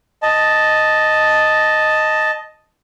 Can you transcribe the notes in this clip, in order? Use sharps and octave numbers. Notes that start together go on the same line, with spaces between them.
D#5 A5